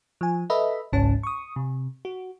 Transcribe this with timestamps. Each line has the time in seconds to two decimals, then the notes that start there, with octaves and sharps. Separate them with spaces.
0.21 F3 G#5
0.50 A4 B4 D#5 E5 B5
0.92 G#1 C#2 G#2 C#4 A5
1.23 C#6 D#6
1.56 C3
2.05 F#4